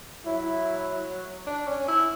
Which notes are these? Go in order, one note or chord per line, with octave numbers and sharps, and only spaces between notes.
F#3 E4
D4
C#4
E4